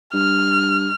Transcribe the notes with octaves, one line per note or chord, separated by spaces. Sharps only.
G2 F6